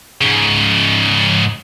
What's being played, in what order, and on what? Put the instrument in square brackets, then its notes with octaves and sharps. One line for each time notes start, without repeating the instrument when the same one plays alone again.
[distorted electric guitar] G#2 C#3